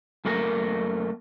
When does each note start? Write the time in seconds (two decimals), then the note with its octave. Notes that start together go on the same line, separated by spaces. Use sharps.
0.25 F#2 A3 A#3 D4 A#4